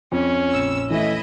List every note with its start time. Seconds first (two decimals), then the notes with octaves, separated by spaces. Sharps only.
0.12 F2 C#4
0.52 A#1 E6
0.90 E3 A3 E4 D#5 E5